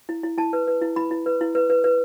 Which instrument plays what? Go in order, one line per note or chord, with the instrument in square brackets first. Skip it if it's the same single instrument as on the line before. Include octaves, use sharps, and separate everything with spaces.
[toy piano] E4
E4
E4 A5
B4
B4
E4
E4 B5
E4
B4
E4
B4
B4
B4